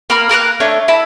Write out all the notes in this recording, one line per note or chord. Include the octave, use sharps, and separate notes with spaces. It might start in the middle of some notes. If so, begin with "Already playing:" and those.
A#3 A#5 B5 F6
A#3 A#4 F5 F#6
A3 D4 C#5 C#6
E4 A5 B5